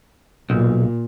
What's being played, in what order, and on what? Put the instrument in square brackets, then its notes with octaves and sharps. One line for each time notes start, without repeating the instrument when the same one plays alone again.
[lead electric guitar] B1 [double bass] A#2